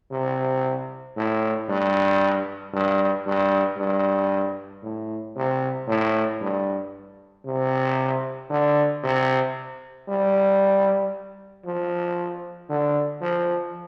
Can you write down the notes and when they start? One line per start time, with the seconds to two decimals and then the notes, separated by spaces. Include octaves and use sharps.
0.11 C3
1.17 A2
1.69 G2
2.73 G2
3.26 G2
3.78 G2
4.83 A2
5.36 C3
5.87 A2
6.41 G2
7.45 C3
8.50 D3
9.03 C3
10.08 G3
11.65 F3
12.69 D3
13.21 F3